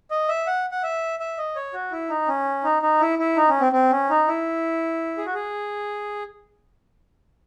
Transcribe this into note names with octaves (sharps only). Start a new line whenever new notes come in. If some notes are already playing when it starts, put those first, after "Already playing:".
D#5
E5
F#5
F#5
E5
E5
D#5
C#5
F#4
E4
D#4
C#4
D#4
D#4
E4
E4
D#4
C#4
C4
C4
C#4
D#4
E4
G#4
F#4
G#4